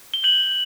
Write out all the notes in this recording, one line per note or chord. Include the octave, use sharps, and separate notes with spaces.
G7
G6 F#7